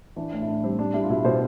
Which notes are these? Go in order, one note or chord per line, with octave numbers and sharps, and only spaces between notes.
E3 D4
A2
E4
A2 D4
G3 C4
G3 D4
G3 E4
F4
B2 E4
B2 C5